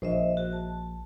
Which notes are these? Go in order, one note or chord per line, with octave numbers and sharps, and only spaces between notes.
A#1 C5 D#5 E5
F#4
A5